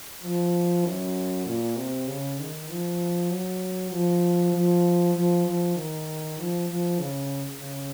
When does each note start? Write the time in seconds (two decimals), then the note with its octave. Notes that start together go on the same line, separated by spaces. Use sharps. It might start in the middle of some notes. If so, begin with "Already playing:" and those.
0.23 F3
0.85 F#2
1.46 A#2
1.77 C3
2.07 C#3
2.39 D#3
2.69 F3
3.31 F#3
3.92 F3
4.53 F3
5.15 F3
5.45 F3
5.76 D#3
6.39 F3
6.68 F3
6.99 C#3
7.60 C#3